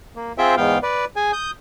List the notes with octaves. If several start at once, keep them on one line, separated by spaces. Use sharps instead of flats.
A#3
C4 F4 G#4 C5 E5 G5
E2 G#2 B3 F5 G5
B4 D5
G#4 G#5
D#6 G6